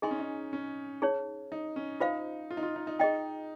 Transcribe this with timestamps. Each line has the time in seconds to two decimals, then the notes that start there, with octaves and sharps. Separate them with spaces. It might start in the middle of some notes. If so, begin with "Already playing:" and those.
0.02 D#4 G#4 D#5 G#5 C6
0.11 C#4
0.19 D#4
0.53 C#4
1.02 D#4 G#4 C#5
1.52 D#4
1.76 C#4
2.00 D#4 F4 C5 F5
2.51 F4
2.57 D#4
2.63 F4
2.76 D#4
2.87 D#4
2.99 D#4 G#4 D#5 G5